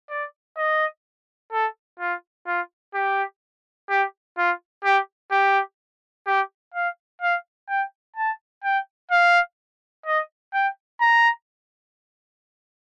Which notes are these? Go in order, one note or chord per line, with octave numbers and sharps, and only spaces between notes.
D5
D#5
A4
F4
F4
G4
G4
F4
G4
G4
G4
F5
F5
G5
A5
G5
F5
D#5
G5
A#5